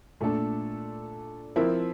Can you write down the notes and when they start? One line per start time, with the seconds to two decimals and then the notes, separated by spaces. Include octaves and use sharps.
0.20 A#2 A3 D4 A4
1.56 F3 C4 E4 A#4